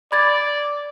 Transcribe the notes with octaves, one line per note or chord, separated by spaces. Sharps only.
D5 B5 G#6 A6